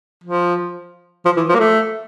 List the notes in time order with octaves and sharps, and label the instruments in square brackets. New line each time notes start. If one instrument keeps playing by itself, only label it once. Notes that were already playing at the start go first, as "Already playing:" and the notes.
[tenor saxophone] F3
F3
E3
F3
A#3
A3